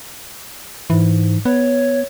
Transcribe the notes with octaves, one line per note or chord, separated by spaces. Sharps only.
G#2 E3
B3 C#5